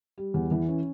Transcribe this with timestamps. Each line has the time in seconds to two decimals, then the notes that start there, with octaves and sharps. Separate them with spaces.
0.18 G3
0.34 E2
0.51 E3
0.68 C#4